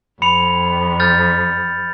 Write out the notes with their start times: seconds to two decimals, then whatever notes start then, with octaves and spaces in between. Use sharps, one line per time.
0.22 F2 B5 C#7 F7
1.00 F6 G6 A6